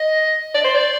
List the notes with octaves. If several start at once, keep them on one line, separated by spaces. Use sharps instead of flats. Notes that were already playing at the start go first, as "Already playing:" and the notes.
Already playing: D#5
D5
C5
D5